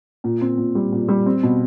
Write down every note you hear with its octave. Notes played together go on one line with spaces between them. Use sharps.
A#2
C4
A#2
G3
A#2
G3
C4
B2